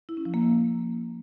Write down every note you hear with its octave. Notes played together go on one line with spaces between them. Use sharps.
E4
C#4
F3
A#3